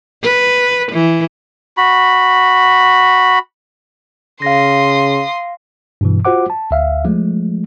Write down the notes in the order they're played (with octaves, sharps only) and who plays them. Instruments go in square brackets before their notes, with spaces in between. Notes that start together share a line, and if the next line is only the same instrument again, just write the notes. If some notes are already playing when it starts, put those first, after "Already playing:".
[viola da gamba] B4
E3
[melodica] F#4 B5
[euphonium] C#3 [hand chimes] F5 A#6 [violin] C6 D#6
[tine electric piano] G2 B2 E3
F4 F#4 C5 F#5 D6
A5
D2 E5 F5
F3 G#3 A3